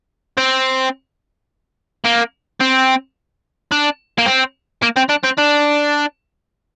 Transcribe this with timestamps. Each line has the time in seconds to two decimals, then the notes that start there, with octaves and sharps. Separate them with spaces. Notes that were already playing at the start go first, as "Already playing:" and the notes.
0.37 C4
2.04 A#3
2.60 C4
3.72 D4
4.18 A#3
4.26 C4
4.83 A#3
4.97 C4
5.09 D4
5.24 C4
5.38 D4